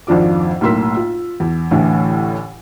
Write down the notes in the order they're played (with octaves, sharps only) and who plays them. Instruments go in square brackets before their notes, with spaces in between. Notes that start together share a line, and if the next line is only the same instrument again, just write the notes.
[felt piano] G#1 F2 F3 D4 F4 D6
B1 A2 A#3 C6 E6 B6
F4
E2
A1 A2 D3 E3